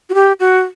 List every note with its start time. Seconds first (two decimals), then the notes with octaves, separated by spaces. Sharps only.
0.10 F#4
0.14 G4
0.40 F#4